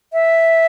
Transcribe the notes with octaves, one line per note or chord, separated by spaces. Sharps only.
E5